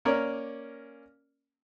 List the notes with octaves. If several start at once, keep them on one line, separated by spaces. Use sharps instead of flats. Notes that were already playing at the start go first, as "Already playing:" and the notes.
A#3 C#4 A#4 C#5 D5